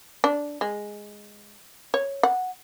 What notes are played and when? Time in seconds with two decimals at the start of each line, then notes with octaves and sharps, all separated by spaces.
0.24 D4
0.61 G#3
1.94 C#5
2.23 F#5